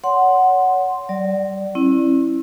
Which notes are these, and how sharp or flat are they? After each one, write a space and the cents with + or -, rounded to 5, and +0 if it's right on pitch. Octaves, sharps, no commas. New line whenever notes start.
C#5 +25 F#5 +0 C6 +0
F#3 +45 D5 +0
C#4 -45 E4 +0